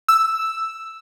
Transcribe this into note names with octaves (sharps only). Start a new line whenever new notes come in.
E6